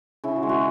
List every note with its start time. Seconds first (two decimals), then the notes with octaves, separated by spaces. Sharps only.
0.24 C#3 E4
0.36 F#4
0.43 G#3
0.49 F#4